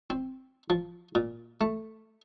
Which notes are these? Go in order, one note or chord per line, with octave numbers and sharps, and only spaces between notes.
C4
F3
A#2
A3